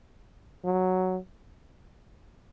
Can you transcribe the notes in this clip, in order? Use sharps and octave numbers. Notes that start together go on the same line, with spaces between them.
F#3